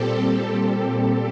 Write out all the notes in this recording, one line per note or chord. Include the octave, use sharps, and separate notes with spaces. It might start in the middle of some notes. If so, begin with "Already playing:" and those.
Already playing: A#2 G3 C4 G4 A4